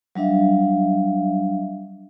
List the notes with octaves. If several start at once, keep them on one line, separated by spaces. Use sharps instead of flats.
F#3 G3 D4 E5 F5